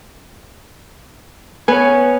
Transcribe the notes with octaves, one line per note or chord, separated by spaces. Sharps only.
B3 B4 C#5 G#5